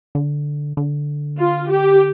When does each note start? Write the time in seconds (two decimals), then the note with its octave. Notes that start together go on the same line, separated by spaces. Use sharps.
0.15 D3
0.77 D3
1.39 F4
1.71 G4